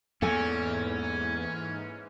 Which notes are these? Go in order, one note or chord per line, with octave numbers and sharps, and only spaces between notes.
E2 G#2 E3 A#3 C#4 A4 G#5